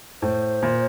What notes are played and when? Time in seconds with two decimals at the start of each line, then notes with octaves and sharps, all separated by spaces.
0.22 A2 C5
0.62 A#2